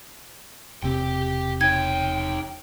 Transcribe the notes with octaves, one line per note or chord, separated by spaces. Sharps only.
E1 C3 C4 G4 G5
D#4 C#5 G5 G#6